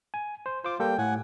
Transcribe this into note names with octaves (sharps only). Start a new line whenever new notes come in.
G#5
C5
F4 C5 D6
G3 A#3 A4 G5
A2 F#5 G#5